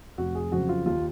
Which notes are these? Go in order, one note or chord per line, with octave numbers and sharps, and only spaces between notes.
F1 F#4
G#4
F2 C#3 F#3 F#4
F4
D#2 F4